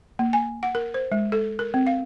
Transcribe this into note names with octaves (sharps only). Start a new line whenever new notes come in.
A#3
G#5
F#5
A#4
C5
G#3
A4
A#4
C4
F5